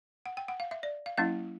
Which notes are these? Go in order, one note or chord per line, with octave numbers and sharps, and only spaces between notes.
F#5
G5
F#5
F5
E5
D5
F5
F#3 A#3 C#4 E4 F5